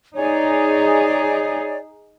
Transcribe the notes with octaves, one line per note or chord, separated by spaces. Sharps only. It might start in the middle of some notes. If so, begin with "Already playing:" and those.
D#4 G#4 C#5 D5 G#5